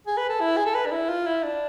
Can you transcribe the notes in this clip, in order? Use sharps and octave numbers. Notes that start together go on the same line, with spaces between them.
G#4
B4
A4
E4
G#4
A4
B4
D4
E4
F4
E4
D4